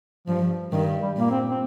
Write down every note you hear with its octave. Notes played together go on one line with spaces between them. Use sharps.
G2 F3
G2 D#3
G3
A#2 A#3
C4
C4